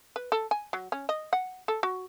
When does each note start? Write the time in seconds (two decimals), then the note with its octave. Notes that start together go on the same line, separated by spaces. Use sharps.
0.16 B4
0.32 A4
0.51 G#5
0.73 F#3
0.92 C#4
1.09 D#5
1.33 F#5
1.68 A4
1.83 F#4